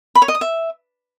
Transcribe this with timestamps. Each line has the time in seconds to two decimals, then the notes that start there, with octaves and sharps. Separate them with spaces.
0.15 B5
0.22 C#5
0.28 D#5
0.35 D#6
0.41 E5